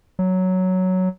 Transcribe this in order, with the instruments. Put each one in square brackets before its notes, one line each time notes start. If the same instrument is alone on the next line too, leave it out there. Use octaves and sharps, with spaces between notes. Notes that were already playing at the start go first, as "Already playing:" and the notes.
[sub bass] F#3